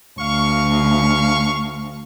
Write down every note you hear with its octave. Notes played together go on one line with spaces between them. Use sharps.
D2 F5 C#6